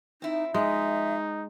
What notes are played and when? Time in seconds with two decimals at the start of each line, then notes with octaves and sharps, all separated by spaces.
0.22 C4 D#4 E4
0.54 F3 G#3 D#4 E5